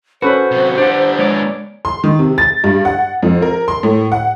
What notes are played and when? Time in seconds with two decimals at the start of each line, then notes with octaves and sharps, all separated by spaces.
0.22 C#4 F#4 A4 B4 C5
0.51 C3 F#3
0.78 B3 D4 G4 F#5
1.19 G#3 C#5 D5
1.85 C6
2.04 D#3
2.19 C3
2.38 A6
2.64 G2
2.85 F#5
3.23 F2
3.42 A#4
3.68 C6
3.83 A2
4.12 F#5